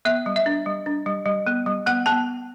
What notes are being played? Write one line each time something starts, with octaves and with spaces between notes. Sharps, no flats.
B3 E5
G3
E5
D4
G3
D4
G3
G3
B3
G3
B3 F#5
B3 A5